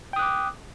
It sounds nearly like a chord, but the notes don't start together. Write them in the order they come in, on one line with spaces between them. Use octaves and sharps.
G5 D#6 F#6 D6